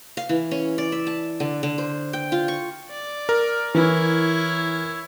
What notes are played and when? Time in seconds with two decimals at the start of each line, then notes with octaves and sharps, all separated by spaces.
0.17 F5
0.29 E3
0.51 C#4
0.78 D5
0.92 E5
1.07 A5
1.40 D3
1.63 D3
1.78 C5
2.13 G5
2.32 F4
2.48 C#6
2.89 D5
3.29 A#4
3.74 E3 E4 C#5